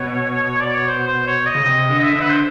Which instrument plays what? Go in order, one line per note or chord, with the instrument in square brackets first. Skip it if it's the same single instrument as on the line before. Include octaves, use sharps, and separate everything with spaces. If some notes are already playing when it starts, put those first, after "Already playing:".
Already playing: [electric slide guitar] B2 [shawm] C#5
[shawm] D5
C#5
C5
C5
C#5
D#5
[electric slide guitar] C#3
[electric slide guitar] C3 [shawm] D#5
[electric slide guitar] D3
[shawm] D#5
E5
[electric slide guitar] D3 [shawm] B4
[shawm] C5